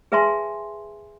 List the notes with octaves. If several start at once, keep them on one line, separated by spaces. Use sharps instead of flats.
G#4 B4 E5 G#5 A5 C6